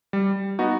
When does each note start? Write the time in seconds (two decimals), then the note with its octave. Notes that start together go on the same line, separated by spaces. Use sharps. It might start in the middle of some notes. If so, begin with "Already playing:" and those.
0.13 G3
0.59 B3 D#4 F#4